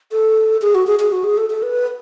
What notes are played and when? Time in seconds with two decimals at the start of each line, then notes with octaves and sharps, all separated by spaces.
0.12 A4
0.62 G#4
0.75 F#4
0.87 G#4
1.00 G#4
1.12 F#4
1.24 G#4
1.37 A4
1.50 A4
1.63 B4